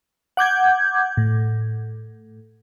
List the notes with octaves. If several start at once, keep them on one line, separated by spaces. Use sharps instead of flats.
F#5 D6 G6 G#6
A2